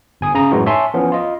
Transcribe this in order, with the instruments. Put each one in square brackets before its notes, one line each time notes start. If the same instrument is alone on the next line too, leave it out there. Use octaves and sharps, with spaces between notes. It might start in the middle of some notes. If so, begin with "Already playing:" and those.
[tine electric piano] G1 G#5 D#6
C#3 C#4 A#5 D#6
F#2 A2 E3 G#3 D#4 F#4
C#5 E5 G#5 A5 C6
E3 F3 B3 C#4
F4 D#5